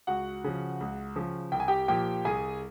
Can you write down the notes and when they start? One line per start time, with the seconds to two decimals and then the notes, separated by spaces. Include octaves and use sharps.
0.07 C#2 F#4 F#5
0.44 C#3 F3
0.80 C#2
1.16 C#3 F3
1.52 C2 G5
1.60 G#5
1.68 G4 G5
1.88 A#2 F3 G4 G5
2.25 C2 G#4 G#5